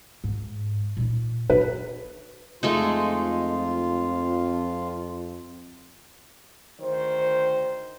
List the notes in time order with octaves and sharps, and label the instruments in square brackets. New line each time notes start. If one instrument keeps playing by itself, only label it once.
[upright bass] G#2
A#2 D#4
[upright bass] F#3 [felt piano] B4
[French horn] F2 [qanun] G#3 A3 D#4 [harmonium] F4
[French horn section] D2 D#3 C5